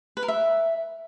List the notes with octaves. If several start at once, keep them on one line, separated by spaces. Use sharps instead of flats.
B4
A#4
E5